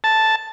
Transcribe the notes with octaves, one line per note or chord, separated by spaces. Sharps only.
A5